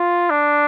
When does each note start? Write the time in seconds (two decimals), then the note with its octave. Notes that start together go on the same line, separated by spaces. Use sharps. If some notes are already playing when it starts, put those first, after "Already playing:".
Already playing: F4
0.30 D4